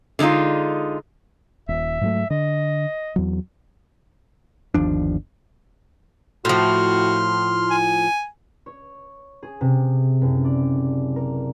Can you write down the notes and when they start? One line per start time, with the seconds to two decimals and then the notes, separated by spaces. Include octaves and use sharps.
0.19 D3 G#3 C4 D#4 F4
1.69 D#1 E5
2.01 G#2 F#3 A3
2.30 D3 D#5
3.16 E2 F#3
4.74 G1 D#2 F3 D4
6.45 A2 F3 F#4 C6 F6
7.70 G#5
8.66 C#5
9.43 G#4
9.61 C3
10.21 F#1
10.45 D5
11.16 A#4